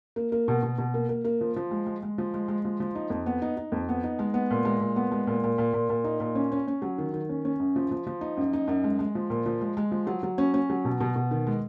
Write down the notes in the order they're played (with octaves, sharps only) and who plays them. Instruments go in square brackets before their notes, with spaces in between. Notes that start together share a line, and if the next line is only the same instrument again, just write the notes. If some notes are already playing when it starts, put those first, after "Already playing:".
[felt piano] A#3
A#3
B2
B2
B2
A#3
A#3
A#3
F3
F3
G#3
G#3
G#3
F3
G#3
G#3
F3
F3
D#4
F2
B3
D#4
D#4
F2
B3
D#4
G#3
B3
A#2
G#3
A#2
B3
G#3
A#2
A#2
A#2
A#2
A#2
D#4
A#2
C#4
C#4
C#4
F#3
D#3
D#3
C#4
C#4
F#2
F3
F3
F3
D#4
F#2
D#4
F#2
G#3
G#3
F3
A#2
F3
G#3
G#3
F3
F#3
F#3
C#4
C#4
F#3
B2
B2
B2
D#3
G#3